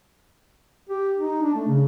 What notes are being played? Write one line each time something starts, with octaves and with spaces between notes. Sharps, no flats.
G4
D#4
D4
A3
C#3